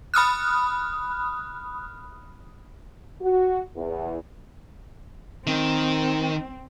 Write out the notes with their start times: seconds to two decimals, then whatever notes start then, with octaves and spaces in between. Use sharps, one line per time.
0.14 B5 D#6 F6 F#6
3.21 F#4
3.76 E2
5.47 D#3 C4